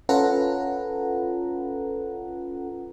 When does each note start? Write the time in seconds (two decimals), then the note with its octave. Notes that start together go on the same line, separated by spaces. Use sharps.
0.09 C#4 F4 A4 B4 F#5 A#5